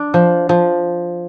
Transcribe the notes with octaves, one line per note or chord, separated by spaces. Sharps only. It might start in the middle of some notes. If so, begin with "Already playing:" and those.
Already playing: D4
F3
F3